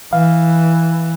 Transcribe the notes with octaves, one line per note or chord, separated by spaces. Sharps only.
E3 F5